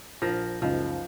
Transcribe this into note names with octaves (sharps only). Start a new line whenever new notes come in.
A#1 F3 A#4 A#6
F#1 C#2 F3 D#4